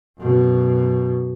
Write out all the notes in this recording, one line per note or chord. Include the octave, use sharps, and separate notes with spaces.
F#2 B2